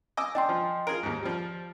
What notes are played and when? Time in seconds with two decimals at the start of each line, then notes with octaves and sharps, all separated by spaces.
0.17 D#5 G#5 D6 E6
0.35 D4 D#5 G5 C6
0.49 F3
0.87 F4 G#4 A#4 D7
1.03 D#2 G#2
1.23 F3 G3